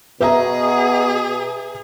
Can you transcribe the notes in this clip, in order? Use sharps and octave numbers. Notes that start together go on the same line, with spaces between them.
B2 G#4 B4 E5 A#5